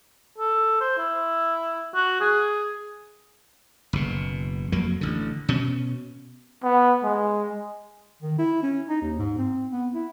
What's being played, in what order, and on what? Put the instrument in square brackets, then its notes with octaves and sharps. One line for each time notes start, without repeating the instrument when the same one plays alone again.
[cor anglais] A4
C5
E4
F#4
G#4
[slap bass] F#1 B2
F2 F#3 A#3
A1 D3
B2 C#4
[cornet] B3
G#3
[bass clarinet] D#3
E4
C#4
D#4
D#2
G#2
C4
B3
E4